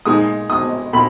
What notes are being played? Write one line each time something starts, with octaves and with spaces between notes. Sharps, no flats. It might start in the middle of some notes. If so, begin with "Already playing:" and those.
A#2 G#3 D#4 D#6
D#6
A#2 B5